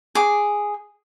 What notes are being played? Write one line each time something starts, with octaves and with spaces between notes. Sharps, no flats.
G#4 D6